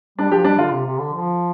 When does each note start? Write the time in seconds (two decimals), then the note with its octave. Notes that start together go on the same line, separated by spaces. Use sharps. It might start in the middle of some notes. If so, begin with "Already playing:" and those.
0.18 G3 D4
0.32 F3 G4
0.45 G3 D4
0.59 D3 F4
0.73 C3
0.86 C3
0.99 D3
1.13 F3